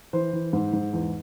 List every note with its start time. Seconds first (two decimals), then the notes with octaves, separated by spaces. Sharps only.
0.13 E3 C5
0.33 E3
0.53 G#2
0.73 G#2
0.93 E2